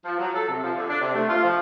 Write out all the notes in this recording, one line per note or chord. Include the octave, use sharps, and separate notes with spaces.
F3
F#3
A4
C3
F3
D3
D4
C3
A3
F4
F3